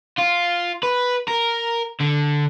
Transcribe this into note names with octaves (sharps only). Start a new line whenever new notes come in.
F4
B4
A#4
D3